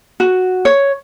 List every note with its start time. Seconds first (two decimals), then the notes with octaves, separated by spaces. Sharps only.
0.20 F#4
0.65 C#5